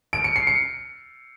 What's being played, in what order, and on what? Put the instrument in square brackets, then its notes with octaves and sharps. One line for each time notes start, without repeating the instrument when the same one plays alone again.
[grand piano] D7
C#7
C7
C#7